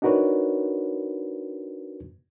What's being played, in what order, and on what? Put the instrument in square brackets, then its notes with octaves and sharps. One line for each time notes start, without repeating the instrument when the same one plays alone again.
[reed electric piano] D4 D#4 F#4 A#4 B4 C#5